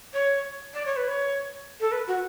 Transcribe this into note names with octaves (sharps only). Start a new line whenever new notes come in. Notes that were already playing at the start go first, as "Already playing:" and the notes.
C#5
D5
C#5
B4
C#5
A4
B4
F#4